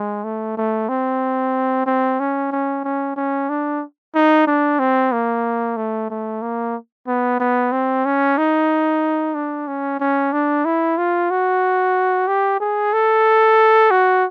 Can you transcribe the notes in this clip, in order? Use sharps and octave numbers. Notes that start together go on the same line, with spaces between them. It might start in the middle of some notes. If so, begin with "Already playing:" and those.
Already playing: G#3
A3
A3
C4
C4
C#4
C#4
C#4
C#4
D4
D#4
D4
C4
A#3
A3
A3
A#3
B3
B3
C4
C#4
D#4
D4
C#4
C#4
D4
E4
F4
F#4
G4
G#4
A4
F#4